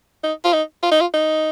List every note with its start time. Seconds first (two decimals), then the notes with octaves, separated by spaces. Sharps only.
0.23 D#4
0.45 F4
0.53 D#4
0.83 F4
0.92 D#4
1.01 F4
1.14 D#4